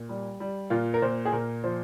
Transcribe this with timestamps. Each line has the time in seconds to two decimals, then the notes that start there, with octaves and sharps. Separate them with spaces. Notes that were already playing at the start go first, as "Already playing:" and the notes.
Already playing: A#2
0.09 G3
0.40 G3
0.70 A#2 F4
0.94 A#4
1.02 A#2 C5
1.25 G#4
1.32 A#2 A#4
1.64 F3 C5